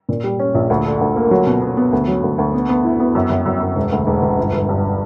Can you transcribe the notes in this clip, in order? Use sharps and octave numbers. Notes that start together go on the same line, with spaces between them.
A#2
G3
C#4
A#1
D2
D3
D2
A#3
F#3
B2
B3
B3
D2
F#3
D2
D2
B3
B3
E4
B3
F#2
F#2
F#2
F#2
E1
D2
E1
E1
G1
G1
G2